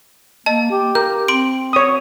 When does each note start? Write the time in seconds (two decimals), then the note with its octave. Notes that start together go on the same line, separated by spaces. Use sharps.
0.46 A#3 D#5 A5
0.71 G4
0.95 A#4 G6
1.28 C4 C6 D7
1.73 C#5 D#6